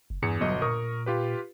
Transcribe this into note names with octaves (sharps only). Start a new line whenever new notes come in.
F#1
E2 G2 G#4 C#7
G1 B2 F#3 D#5
A#2 A#4 C#6 D#6
F4 G4 B4